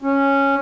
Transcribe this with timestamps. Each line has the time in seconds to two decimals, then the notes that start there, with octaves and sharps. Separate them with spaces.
0.02 C#4